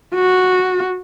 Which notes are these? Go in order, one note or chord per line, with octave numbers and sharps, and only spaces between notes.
F#4